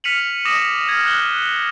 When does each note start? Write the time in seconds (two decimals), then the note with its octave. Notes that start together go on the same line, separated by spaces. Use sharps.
0.04 F6 B6 C#7 D#7 F7 F#7
0.45 D6 D#6 A#6 E7 F#7
0.88 F6 G#6 E7
1.04 F6 F#6 F#7 G7